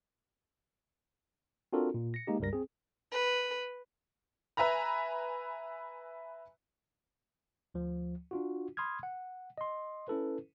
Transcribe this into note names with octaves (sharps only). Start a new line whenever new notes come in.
C4 D4 F4 F#4 A4 A#4
A#2
A#6 C#7
G#3 A#3 D#4 G4
C#2 G2 G3 A#4 A#6
C4 G#4
B4
B4 E5 G#5 A#5 B5
D2 F3
D4 F4 F#4
B5 C6 D#6 F6 G#6
F#5
D#5 C6
C#4 E4 A4 B4